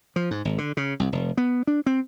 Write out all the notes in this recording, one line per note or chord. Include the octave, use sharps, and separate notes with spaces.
F3
G#2
G#1
D3
C#3
C2
F1
B3
D4
C4